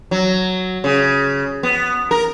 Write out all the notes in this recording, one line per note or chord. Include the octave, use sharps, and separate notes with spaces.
F#3
C#3
B3
A#4